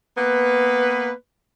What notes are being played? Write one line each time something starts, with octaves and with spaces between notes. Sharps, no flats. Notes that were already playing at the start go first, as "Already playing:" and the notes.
A#3 B3 B4